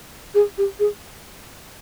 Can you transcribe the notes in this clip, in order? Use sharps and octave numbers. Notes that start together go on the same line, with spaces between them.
G#4
G4
G#4